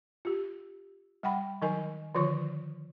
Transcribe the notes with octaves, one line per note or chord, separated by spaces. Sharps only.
F4 G4
G3 F#5 G5 B5
D#3 F#3 D#4 A#4 D#5 G#5
D3 D#3 F3 F4 C#5 C#6